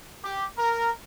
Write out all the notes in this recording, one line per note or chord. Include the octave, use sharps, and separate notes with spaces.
G4
A#4